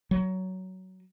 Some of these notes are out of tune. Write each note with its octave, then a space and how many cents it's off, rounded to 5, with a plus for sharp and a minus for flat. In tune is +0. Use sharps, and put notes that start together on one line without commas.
F#3 +15